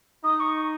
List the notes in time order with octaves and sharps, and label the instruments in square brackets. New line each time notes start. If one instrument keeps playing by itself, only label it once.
[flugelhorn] D#4 [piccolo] D#6
[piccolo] C#6